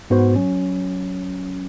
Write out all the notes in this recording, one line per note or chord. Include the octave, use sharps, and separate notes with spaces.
G#2 B3 F#4 C5
F#3 C#4